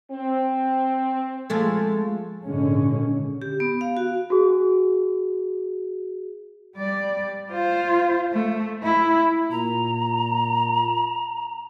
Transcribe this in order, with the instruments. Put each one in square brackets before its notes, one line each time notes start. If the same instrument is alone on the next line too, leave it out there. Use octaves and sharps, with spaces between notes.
[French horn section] C4
[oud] F3 G#3 A3
[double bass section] G#1 A#2 D3 G#3 C#4
[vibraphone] G4
B3
F5
F#4
[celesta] F#4 G#4
[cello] G3 D5
F4 C5
A3
E4
[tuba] A#2 [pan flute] A#5